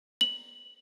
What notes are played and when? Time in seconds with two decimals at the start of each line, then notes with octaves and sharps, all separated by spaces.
0.21 F#7